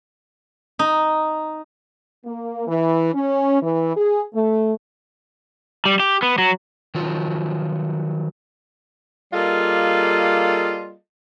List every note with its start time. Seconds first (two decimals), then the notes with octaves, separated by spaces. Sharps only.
0.79 D#4
2.26 A#3
2.67 E3
3.14 C#4
3.61 E3
3.96 G#4
4.34 A3
5.85 G3
6.00 G4
6.23 B3
6.38 F#3
6.95 D#3 F3 F#3 F4
9.33 G3 A#3 F4 G#4 A4 D#5